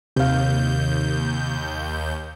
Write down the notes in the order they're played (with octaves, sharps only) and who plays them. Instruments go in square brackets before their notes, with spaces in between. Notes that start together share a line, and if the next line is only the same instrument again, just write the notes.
[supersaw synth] D#2 G6 [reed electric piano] C3 F5